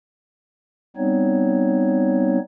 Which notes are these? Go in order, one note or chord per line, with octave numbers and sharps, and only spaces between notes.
G3 B3 C4 D#4 C#5